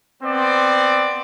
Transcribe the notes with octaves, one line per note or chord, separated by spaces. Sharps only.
B3 C4 D5